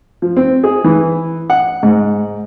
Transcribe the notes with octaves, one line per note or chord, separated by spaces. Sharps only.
F3
C4
G#4
E3
F#5
G#2